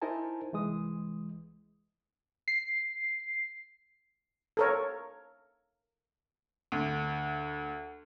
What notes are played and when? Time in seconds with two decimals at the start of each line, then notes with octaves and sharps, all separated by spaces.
0.02 D#4 E4 A#4 C5 G#5 A5
0.53 C2 E3 G#3 D#6
2.48 C7
4.57 A4 A#4 C#5
6.72 D2